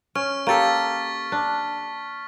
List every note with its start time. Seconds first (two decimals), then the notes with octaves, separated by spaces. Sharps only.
0.15 C#4 C#6 F6
0.47 A#3 G4 A4 C#6 A6 B6
1.32 D4